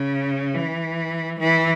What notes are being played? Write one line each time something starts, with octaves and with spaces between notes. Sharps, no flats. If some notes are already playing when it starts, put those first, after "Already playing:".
Already playing: C#3
E3
E3